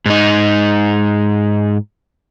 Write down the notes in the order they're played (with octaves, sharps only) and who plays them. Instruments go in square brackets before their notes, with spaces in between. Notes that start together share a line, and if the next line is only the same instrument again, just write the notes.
[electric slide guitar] G#2 D#4